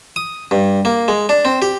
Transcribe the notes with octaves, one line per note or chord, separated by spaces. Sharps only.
D#6
G2
A#3
G#3
D4
C4
G4